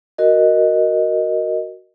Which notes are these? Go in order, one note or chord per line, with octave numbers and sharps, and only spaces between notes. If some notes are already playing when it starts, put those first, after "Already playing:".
F#4 A#4 D#5